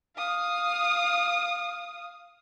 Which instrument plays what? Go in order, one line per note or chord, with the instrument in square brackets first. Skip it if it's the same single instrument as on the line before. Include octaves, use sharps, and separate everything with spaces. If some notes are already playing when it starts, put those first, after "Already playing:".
[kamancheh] F5 D#6